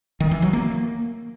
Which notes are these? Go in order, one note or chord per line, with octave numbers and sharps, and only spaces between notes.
D#3
E3
F#3
A#3